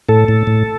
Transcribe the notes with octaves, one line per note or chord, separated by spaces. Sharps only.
A2 A4
A2
A2